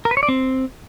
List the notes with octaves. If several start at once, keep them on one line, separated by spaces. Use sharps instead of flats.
A#4
B4
C#5
D5
C4